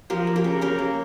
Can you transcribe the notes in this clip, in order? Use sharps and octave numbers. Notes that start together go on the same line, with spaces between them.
F3 G4 A#4
A#3
G4 A#4
C#3
C#3 G4 A#4
A#3